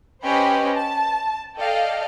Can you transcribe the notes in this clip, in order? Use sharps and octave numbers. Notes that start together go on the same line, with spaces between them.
C#4 G4 B4 C5 D#5 B5
A5
A4 D5 D#5 F5 G5